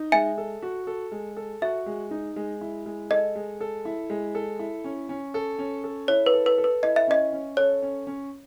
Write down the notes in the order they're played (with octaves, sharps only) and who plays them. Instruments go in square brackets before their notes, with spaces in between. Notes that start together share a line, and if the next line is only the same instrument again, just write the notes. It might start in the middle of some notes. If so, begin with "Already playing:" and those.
Already playing: [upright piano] D#4
[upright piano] G#3 [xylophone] E5 G#5
[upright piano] A4
F#4
A4
G#3
A4
[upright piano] F#4 [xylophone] E5
[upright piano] G#3
D#4
G#3
E4
G#3
[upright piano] A4 [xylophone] D#5
[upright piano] G#3
A4
E4
G#3
A4
E4
C#4
C#4
A4
C#4
A4
[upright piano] E4 [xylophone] C#5
[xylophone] B4
[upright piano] A4
[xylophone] B4
[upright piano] A4
[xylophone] B4
[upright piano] E4 [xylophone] D#5
[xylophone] E5
[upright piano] C#4 [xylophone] D#5
[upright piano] C#4
[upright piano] A4 [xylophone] C#5
[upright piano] C#4
C#4